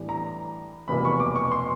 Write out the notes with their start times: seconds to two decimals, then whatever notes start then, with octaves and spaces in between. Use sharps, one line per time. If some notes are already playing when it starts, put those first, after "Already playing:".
Already playing: A2 E3 G3 B3 D4
0.09 A#5
0.88 F1 E2 B2 G3 A#3 B5
1.05 C#6
1.20 D6
1.36 C#6
1.52 C6